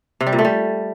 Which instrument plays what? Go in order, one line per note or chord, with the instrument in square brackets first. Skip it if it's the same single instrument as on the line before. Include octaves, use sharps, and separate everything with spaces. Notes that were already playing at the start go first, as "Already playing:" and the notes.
[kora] C3
G3
A#2
A3
G3